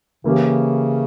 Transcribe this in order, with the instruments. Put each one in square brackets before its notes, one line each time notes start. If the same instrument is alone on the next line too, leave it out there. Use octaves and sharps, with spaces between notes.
[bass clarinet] C#3 [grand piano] E3 A#3 C#4 G4